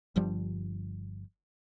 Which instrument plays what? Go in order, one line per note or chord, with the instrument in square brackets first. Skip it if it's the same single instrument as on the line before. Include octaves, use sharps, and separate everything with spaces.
[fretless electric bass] G1 G2 F3 G3